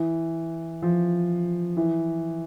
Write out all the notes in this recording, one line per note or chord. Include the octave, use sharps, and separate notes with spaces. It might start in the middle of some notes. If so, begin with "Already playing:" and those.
Already playing: E3
F3
E3